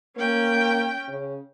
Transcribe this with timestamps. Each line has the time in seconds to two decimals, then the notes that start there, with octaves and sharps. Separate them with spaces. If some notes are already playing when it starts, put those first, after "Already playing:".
0.17 A#3 C#4 G5
1.08 C#3